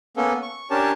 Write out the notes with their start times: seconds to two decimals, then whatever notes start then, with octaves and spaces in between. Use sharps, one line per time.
0.17 A#3 B3 C#4 A4
0.42 C#6
0.70 C#4 D4 G4 A#4 C#5 A5